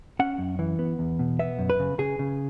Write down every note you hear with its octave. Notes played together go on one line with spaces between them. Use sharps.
C#4 F#5
F#2
E3
B3
E2
B2
B3 E5
F#2
B4
C#3
C#3 G#4
C#3